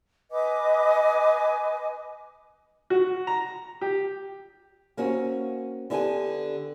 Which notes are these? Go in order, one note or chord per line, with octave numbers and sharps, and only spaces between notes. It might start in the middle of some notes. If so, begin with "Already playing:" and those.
B4 D#5 G#5 D6
F#4
A#5
G4
A#3 C4 C#4 F#4
D3 B3 D4 G4 F#5 G#5